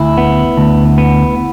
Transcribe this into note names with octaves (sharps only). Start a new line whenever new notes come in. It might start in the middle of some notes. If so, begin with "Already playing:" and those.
Already playing: D2 E4
B3
D2
B3